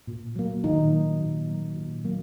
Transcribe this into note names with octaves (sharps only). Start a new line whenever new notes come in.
A#2
F#3 A#3
A#2 D#3 D#4
F#3 A#3
A#2
F#3 A#3
A#2
F#3 A#3